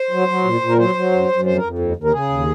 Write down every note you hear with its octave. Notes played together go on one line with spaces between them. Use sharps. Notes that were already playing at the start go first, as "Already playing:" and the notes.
Already playing: C5
F#3
F#3
A#2
A#2
A#4
F#3 C5
F#3
F#2
F#2
F2 C5
A#4
F2
D#2
D#2
A#4
C#3 G#4
D#2